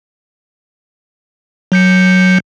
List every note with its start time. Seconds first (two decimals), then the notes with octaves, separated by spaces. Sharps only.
1.72 F#3 G6 C#7